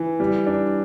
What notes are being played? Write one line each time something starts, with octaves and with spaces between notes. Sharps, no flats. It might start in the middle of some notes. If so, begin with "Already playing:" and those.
Already playing: E3
G3
D4